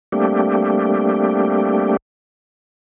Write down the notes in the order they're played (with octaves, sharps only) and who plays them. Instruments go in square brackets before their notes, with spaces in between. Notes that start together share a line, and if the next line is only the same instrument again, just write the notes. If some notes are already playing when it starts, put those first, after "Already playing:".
[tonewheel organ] G3 A3 A#3 C4 D4 G4